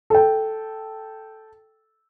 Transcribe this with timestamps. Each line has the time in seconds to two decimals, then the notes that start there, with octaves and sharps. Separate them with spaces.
0.10 A4 G5